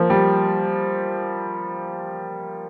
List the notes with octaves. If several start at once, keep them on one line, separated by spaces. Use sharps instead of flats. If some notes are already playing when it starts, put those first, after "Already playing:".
Already playing: F3 A#3
G3